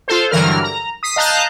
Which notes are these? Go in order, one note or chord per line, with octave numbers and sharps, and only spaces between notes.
F4 A4 C5
G2 D3 E3 F#3 A#4 F6
A#5
D#6 B6 C7
D#5 F5 A5 A#5 F#6 G6